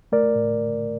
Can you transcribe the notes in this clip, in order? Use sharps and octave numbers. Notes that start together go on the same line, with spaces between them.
A3 A#4 D5
A2